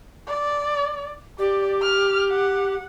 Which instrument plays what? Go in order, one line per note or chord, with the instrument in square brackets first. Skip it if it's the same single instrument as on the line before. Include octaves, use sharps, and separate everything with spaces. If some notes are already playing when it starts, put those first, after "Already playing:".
[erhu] D5
[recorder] G4 [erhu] D5
[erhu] F6
F#5